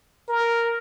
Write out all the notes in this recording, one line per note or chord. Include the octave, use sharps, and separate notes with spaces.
A#4